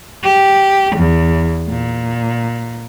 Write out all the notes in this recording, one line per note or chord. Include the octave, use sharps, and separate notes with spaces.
G4
E2
A#2